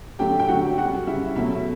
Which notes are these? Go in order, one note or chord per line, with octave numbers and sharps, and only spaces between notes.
D3 F#3 A3 G4 G5
G5
D3 F#3 A3 F#4 F#5
C#3 G3 F#4 F#5
C#3 G3 E4 E5
B2 F#3 A3 E4 E5